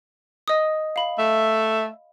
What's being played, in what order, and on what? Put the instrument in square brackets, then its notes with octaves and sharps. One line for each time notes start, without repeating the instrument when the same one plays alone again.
[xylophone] D#5 D#6
F5 B5
[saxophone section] A3 E5